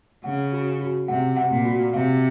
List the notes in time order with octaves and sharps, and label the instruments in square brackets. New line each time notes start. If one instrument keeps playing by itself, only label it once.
[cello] C#3 [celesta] F#5
[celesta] F#4
F#4
[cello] C3 [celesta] F#5
[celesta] F#5
[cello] A#2
[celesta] F#4
[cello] C3 [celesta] F5